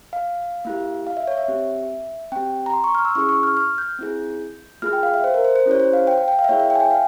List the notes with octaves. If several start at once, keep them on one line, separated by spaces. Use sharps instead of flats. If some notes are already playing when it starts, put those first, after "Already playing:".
F5
A#3 E4 G4
F5
E5
C#5
E5
C4 G4
C4 G4 G5
A#5
C6
C#6
F6
E6
C#4 E4 G#4 C#6
C#6
F6
F6
G6
C4 E4 G#4
A#3 F4 G#4 F6
G5
F5
E5
C5
A#4
C5
C5
C#4 E4 G4 C#5
C5
F5
G5
G5
G5
F5
E5
A#3 E4 G#4 C#5
E5
G5
G#5
G5
F5